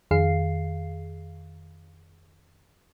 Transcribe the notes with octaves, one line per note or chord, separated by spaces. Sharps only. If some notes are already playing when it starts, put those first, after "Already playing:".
F2 D#3 G#4 F5 C7